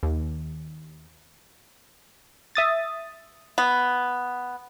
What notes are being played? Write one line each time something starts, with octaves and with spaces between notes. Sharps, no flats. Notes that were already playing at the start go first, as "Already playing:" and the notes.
D#2
E5 D#6 A6
B3